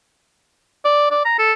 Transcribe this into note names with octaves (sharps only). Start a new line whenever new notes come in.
D5
D5
A#5
A4